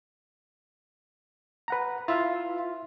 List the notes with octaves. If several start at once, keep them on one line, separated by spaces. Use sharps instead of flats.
B4 F#5 A#5
E4 F4 E5 F5